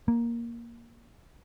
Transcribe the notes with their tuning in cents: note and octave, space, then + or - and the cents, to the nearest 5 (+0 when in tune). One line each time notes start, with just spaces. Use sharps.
A#3 +5